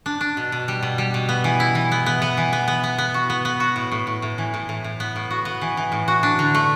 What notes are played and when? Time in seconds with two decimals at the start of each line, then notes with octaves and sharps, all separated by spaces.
0.06 D4
0.21 D4
0.37 B2
0.52 B2
0.68 G3
0.83 B2
0.98 G3
1.14 B2
1.29 B3
1.44 E3
1.60 E4
1.75 E3
1.92 B3
2.06 B3
2.22 B3
2.37 E3
2.53 B3
2.68 B3
2.84 B3
2.98 B3
3.14 F#4
3.30 B3
3.45 B3
3.60 F#4
3.76 A2
3.92 A2
4.07 A2
4.22 A2
4.38 E3
4.54 A2
4.69 A2
4.84 A2
5.00 B3
5.16 A2
5.30 F#4
5.45 B3
5.62 E3
5.77 E3
5.92 A2
6.08 F#4
6.23 D4
6.39 D3
6.55 A3